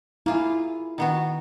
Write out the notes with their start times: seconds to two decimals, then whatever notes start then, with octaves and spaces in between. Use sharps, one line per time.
0.26 A#3 E4 F4 G#4
0.98 D#3 B3 F#4